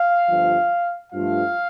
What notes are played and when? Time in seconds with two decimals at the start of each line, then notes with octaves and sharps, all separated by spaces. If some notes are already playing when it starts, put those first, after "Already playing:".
Already playing: F5
0.28 G1 G2 F3
1.12 G2 F3 A3 F5